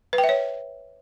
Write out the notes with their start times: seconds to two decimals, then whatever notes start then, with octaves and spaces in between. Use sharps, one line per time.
0.13 B4
0.18 G5
0.24 E5
0.29 C#5